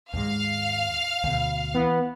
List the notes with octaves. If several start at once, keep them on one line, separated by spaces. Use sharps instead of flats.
D#2 G#2 G#3 F5
D2 B2
E3 B3